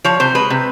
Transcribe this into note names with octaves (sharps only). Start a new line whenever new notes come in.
F3 C#5
C3 C5
G#3 B4
C3